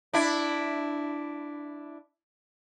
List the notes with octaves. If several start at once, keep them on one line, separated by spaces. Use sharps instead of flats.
D4 E4